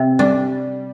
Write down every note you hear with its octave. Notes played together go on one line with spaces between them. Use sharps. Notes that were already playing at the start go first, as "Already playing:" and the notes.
Already playing: C3
G3 D4